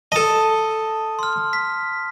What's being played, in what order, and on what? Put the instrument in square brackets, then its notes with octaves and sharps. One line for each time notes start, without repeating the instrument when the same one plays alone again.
[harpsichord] A4 D#5 [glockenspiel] A5 D#6
[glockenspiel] C6 F6
B6